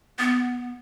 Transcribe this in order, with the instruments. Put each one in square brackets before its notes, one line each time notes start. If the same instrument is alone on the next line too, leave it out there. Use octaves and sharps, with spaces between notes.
[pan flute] B3